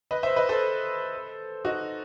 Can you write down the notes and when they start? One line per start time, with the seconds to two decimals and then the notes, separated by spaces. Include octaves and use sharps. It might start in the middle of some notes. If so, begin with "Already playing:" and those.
0.11 B4 D#5
0.23 C5 E5
0.36 B4 D#5
0.49 A4 C5
1.65 D#4 F#4